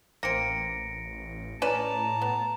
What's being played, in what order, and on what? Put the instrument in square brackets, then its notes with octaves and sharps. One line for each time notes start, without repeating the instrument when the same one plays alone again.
[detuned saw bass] A1 [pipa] A#3 C4 [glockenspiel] A#6 C#7 D7
[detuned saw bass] A2 [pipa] C#4 B4 D5 [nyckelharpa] A5 A#5 [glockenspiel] E7
[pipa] B3